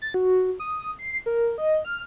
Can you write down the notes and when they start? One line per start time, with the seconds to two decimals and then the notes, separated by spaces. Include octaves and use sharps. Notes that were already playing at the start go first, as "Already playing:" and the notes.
0.02 A6
0.14 F#4
0.60 D#6
0.99 C7
1.26 A#4
1.58 D#5
1.85 F6